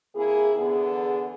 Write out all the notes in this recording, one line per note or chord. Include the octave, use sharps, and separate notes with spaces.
C3 A#3 E4 G#4
E2 D3 B3 G#4